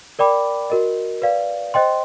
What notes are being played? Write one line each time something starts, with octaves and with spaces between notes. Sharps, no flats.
A#4 D5 G5 B5 D6
F#4 A#4 D#5
B4 D5 F5
C5 D#5 G5 C6